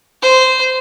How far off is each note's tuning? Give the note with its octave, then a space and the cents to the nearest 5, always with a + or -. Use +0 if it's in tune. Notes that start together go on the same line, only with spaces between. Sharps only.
C5 -15